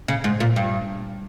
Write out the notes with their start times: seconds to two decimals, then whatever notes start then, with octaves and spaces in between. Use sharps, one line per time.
0.08 C#3
0.24 G#2
0.40 A#2
0.56 G2